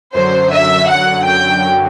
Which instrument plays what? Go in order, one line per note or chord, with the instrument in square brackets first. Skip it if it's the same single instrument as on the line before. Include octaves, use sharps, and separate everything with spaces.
[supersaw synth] F#2 D3 F#3 [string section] C5
[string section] E5
F#5
G5